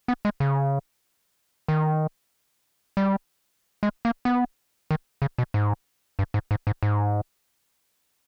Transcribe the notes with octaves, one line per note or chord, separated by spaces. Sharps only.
B3
G#3
C#3
D#3
G3
G#3
A#3
B3
D#3
C#3
B2
G#2
G2
G#2
G#2
G#2
G#2